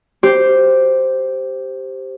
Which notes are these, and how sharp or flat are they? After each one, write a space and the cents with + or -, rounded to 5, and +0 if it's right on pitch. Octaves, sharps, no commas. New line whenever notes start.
G4 -5 C5 +0